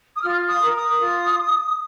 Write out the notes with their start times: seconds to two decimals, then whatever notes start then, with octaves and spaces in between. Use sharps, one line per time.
0.14 D#6
0.21 F4 F6
0.47 D#6
0.61 A#4
0.74 D#6
1.00 F4